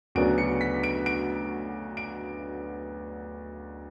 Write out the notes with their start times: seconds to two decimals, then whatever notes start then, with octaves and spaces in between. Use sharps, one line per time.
0.15 D2 C#3 F#3 B3 D4 D7
0.38 C#7
0.61 B6
0.83 D7
1.06 D7
1.97 D7